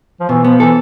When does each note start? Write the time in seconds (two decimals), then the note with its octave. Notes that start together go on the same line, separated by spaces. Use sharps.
0.20 F3
0.29 B2 E3
0.44 F3 B3
0.59 E3 A4